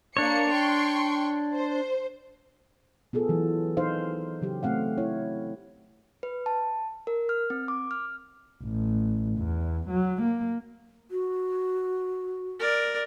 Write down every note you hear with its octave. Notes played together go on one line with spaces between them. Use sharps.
A#3 D4 C#5 C#7
G5 C6 C#6
C5
B3 F4 G#4 A4
E3 F#3
D#4 C5 F5
C#3 F#3 G4
A3 C4 F5 F#5
E4 C#5
B4
A5
A#4
F6
C4
D6
F6
A1
E2
F#3
A#3
F#4
A#4 D5